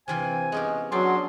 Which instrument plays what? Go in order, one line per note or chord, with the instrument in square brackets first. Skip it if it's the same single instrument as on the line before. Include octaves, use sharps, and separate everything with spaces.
[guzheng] C3 E3 F4 [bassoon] C4 [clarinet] G#5
[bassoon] G#3 [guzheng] B3 C#4 G4
[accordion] F#3 [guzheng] C#4 D4 G4 [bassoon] G#4 [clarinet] C6